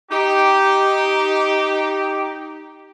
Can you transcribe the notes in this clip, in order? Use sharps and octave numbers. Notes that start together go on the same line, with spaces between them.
D#4 G4